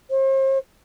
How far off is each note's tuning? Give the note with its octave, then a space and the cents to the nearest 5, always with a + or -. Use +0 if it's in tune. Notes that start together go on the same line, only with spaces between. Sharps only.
C5 +40